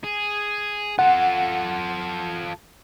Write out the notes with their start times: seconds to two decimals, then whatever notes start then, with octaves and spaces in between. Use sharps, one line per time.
0.04 G#4
0.99 F4 A4 F#5